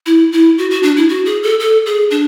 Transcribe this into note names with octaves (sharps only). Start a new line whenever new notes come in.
E4
E4
F#4
F#4
D4
E4
F#4
G#4
A4
A4
G#4
D4